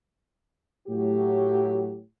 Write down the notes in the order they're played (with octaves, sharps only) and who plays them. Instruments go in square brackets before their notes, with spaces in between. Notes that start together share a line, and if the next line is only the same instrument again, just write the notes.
[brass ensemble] A2 F#3 G4